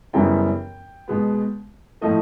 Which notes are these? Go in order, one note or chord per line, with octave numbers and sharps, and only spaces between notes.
F#2 C#3 E3 G3 B3 G5
B2 G#3 B3
A2 F3 A3 D#5